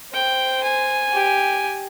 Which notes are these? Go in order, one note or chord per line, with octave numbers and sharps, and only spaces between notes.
C5 G5
G#5
G4